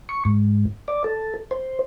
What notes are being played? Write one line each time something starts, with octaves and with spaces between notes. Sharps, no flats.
C#6
G#2
D5
A4
C5